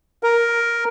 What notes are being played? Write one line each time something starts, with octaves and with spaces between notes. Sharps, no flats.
A#4